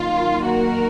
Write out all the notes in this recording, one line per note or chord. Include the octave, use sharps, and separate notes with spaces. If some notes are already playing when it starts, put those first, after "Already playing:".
Already playing: F#2 D#3 A#3 F4
F#4 A#4